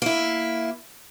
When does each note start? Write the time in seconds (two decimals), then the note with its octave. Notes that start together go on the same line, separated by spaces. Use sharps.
0.02 A#3 E4